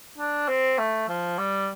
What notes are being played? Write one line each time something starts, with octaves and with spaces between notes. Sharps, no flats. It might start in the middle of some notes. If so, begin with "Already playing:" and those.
D4
C4
A3
F3
G3